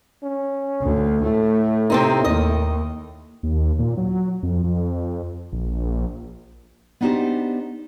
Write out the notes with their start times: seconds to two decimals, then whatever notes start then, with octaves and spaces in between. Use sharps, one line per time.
0.23 C#4
0.81 D2
1.25 A2 A3
1.90 C3 C4 D#4
2.25 D#2 D#5
3.43 D#2
3.79 A#2
3.97 F#3
4.43 F2
4.64 F2
5.53 A#1
7.01 B3 D4 D#4 F#4 G4 C5